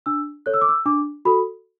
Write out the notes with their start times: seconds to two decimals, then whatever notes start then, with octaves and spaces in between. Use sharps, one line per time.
0.06 D4 E6
0.46 A4 C#5 F#6
0.54 E6
0.61 D6
0.68 E6
0.86 D4 D6
1.25 F#4 A4 B5